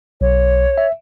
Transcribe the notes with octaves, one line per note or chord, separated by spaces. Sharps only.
B1 C#5
E5